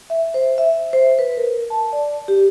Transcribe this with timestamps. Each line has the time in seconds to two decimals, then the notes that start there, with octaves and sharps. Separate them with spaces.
0.10 E5
0.34 C5
0.58 E5
0.93 C5
1.19 B4
1.37 A#4
1.70 A5
1.93 D5
2.28 G4